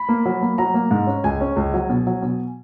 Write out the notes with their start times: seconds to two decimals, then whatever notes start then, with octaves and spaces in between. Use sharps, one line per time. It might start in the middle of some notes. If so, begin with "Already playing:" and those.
Already playing: B5
0.09 A#3
0.25 F#3
0.42 A#3
0.58 F#3 A#5
0.74 A#3
0.91 G#2
1.07 C#4
1.24 C#2 G#5
1.41 C#4
1.56 C#2
1.74 F#3
1.89 B2
2.07 F#3
2.22 B2